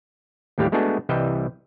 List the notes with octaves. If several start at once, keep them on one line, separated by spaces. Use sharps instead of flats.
D#2 A2 G3 G4 F5
G#3 A3 B3 D4 F#4 G#4
C2 E3 G3 D#5 E5 G5